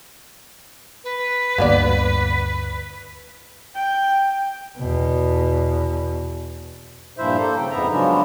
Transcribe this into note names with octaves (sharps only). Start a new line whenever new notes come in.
B4
D2 G2 A#3 B3 D5
G5
E2 B2
G2 A#2 F3 E4 C5 E5
A#3 A4 C5
C#3 G5
F2 G#2 B3 E5 A#5
C#3 F3 F#3 G#3 B3 D4